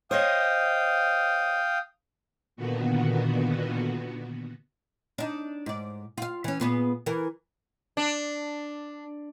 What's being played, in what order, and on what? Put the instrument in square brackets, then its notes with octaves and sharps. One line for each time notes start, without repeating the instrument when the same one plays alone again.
[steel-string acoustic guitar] C5 C#5 D#5 [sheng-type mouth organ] F5 G5 D#6
[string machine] A#2 D3 D#3 B3 F#4
[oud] D4 D#4
G#2 D5
F4 F5
E3 C#4
A#2 B3 G#4
E3 A#4
[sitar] D4